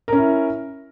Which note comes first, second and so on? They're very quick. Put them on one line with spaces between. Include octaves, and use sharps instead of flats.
A#4 C#4 E4